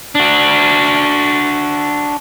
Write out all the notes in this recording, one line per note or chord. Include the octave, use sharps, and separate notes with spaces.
D4 F#4